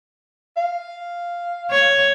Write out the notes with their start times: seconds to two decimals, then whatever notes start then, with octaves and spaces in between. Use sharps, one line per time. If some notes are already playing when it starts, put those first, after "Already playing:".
0.57 F5
1.71 C#5